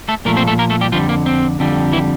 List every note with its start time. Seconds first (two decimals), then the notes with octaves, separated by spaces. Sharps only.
0.09 A3 A4
0.25 A#2 F3 A3 A#3 A#4
0.37 C4 C5
0.48 A3 A4
0.59 A#3 A#4
0.70 A3 A4
0.81 G3 G4
0.92 F2 D3 F3 G3 F4
1.09 A#3
1.26 C4
1.59 F2 D3 G3
1.92 E3 E4